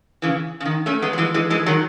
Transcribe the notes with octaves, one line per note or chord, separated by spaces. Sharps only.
C#3 E3
C#3
D#3
A3 C#4
G#3 B3
F#3
E3 G#3
E3 G#3
E3 G#3
D#3 F#3